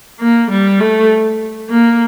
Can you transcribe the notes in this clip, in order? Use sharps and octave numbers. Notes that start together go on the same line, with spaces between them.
A#3
G3
A3
A#3